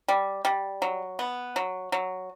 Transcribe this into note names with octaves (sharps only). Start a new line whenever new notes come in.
G3
G3
F#3
B3
F#3
F#3